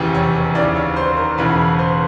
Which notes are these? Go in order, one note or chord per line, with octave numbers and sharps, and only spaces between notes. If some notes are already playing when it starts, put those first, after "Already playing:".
Already playing: F1 E2 C#3 E3 G4 G#4
C#5
D#2 C#3 E3 D5
C#5
C5
A#4
E1 E2 C#3 E3 B4
C5